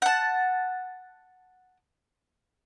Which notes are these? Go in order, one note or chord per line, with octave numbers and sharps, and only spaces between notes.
F#5 A5